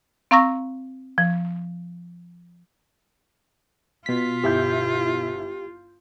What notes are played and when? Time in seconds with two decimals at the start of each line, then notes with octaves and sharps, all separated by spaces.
0.31 C4 F5 A#5 C#6 E6 A#6
1.18 F3
4.06 B2 F4 B6
4.44 G1 E4 G4 G6